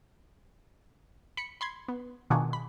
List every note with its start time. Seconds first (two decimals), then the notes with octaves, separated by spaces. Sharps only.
1.37 B5 C#7
1.61 B5 C6 G#6
1.88 B3
2.30 B2 D#3 D4 F4 F#4 G#4
2.53 B5